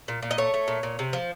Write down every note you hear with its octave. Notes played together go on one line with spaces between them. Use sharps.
A#2
A#2
D#5
A3 C#5
A3
A#2
A#2
C3
F3